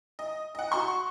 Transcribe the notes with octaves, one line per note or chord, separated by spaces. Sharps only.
D#5
D#5 F#5
F#4 C6 C#6